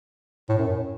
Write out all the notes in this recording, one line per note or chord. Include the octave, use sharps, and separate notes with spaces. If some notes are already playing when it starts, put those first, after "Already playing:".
A2
F#2
A2